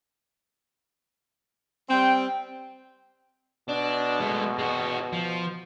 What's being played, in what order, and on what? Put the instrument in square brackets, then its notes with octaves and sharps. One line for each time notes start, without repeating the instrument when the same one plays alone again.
[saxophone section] G3 C4 [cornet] G5
[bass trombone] B2 [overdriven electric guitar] D4
[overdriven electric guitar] G#3 A3
G#3 F#4
F3